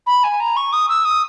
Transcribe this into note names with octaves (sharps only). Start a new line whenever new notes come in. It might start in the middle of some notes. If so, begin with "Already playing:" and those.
B5
G#5
A#5
C#6
D#6
E6
D#6